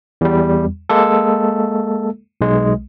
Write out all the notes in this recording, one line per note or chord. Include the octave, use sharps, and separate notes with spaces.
E2 G3
G#3 A#3 A4
B1 G#3